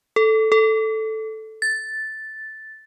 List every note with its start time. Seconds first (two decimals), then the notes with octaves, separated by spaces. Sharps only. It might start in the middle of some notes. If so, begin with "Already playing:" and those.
0.16 A4
0.52 A4
1.62 A6